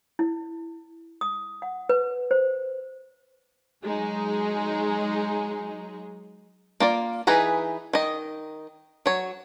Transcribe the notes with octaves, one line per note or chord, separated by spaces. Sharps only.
E4
D#6
F#5
B4
C5
F#3 G#3 D#4 G#4
A#3 F4 D5
E3 D#4 G#4 B4 A#5
D#3 D#5
F#3 C#5